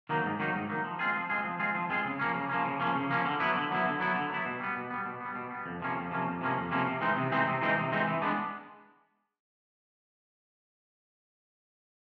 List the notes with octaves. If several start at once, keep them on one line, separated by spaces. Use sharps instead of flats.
D#3 F#3 A#3 D#4
G#2
D#3 F#3 A#3 D#4
G#2
D#3 F#3 A#3 D#4
F3
G#3 C4 F4 G#4
F3
G#3 C4 F4 G#4
F3
G#3 C4 F4 G#4
F3
G#3 C4 F4 G#4
C#3
F3 A#3 C#4
C#3
F3 A#3 C#4
C#3
F3 A#3 C#4
C#3
F3 A#3 C#4
D3
F#3 B3 E4
D3
F#3 B3 E4
D3
F#3 B3 E4
D3
F#3 B3 E4
B2
G3 B3
B2
G3 B3
B2
G3 B3
B2
G3 B3
F2
C3 F3 A#3 C#4
F2
C3 F3 A#3 C#4
F2
C3 F3 A#3 C#4
F2
C3 F3 A#3 C#4
C3
E3 G#3 C4 D#4
C3
E3 G#3 C4 D#4
C3
E3 G#3 C4 D#4
C3
E3 G#3 C4 D#4
E3
G#3 B3 D4